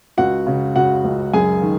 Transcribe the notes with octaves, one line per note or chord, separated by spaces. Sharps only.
C#2 F#4 F#5
C#3
C#3 F#4 F#5
C#2
F#2 G#4 G#5
D#3